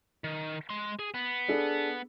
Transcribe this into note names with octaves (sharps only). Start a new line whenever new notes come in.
D#3
G#3 C6
G#4
B3
D4 G#4 A4